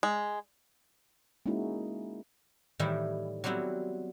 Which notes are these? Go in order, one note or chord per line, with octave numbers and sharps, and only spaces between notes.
G#3
G#3 A#3 C#4 D#4 E4 F#4
A2 D#3 E3 G3 E4
F#3 G3 B3 C4 E4